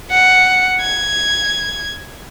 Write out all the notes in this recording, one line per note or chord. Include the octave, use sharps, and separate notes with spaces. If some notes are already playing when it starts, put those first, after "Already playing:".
F#5
G#6